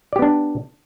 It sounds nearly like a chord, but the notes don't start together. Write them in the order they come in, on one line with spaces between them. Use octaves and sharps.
D5 G4 B3 D4